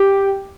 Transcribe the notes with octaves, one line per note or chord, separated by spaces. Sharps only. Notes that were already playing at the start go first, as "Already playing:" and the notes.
Already playing: G4